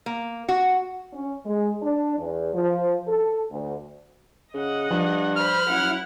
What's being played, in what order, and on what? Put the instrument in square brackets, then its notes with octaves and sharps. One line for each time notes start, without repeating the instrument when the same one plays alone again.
[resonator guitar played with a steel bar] A#3
F#4
[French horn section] C#4
G#3
D4
E2
F3
A4
D2
[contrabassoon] C#3 [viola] D#5 F#5
[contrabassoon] G2 [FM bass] F3
[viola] C5 B5 [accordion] F6
[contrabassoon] F#2 [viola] E4 F#5